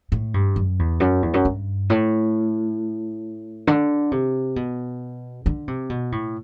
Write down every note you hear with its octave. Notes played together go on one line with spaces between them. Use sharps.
A2
G2
F#2
E2
F#2
E2
F#2
G2
A2
D3
C3
B2
D3
C3
B2
A2